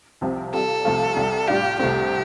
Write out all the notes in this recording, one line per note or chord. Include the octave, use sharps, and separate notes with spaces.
C2 C3 F3 C4
C3 G3 F4 A4
C2 C3 F3 A3 F4
C2 C3 G3
A2 G3 D4 F4 G4
C2 C3 A3 C4 G4